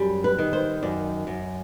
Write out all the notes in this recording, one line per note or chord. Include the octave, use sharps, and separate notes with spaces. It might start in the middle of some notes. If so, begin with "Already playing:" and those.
Already playing: F#2 G3
B4
D#3
C5
F#2 D5
F#2